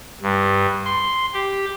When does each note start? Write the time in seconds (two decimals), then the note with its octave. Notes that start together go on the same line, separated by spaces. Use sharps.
0.22 G2
0.85 C6
1.34 G4